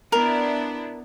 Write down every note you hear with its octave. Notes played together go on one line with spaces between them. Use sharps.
B3 D4 E4 A#4